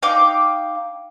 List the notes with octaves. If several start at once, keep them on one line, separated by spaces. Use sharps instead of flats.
D#4 F5 G5 D6